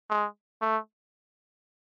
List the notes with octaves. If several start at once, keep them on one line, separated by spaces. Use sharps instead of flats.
G#3
A3